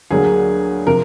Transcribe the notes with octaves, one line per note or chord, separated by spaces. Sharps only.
D2 D3 F#3 A#3 G#4
C3 F3 A#4